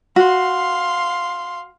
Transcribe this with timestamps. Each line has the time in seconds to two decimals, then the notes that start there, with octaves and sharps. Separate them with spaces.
0.16 F#4 F5 C6